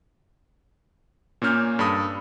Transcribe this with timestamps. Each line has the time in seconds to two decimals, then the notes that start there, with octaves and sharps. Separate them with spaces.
1.42 A#2 A#3 C#4 F6 G6
1.79 G2 A4 B5 D#6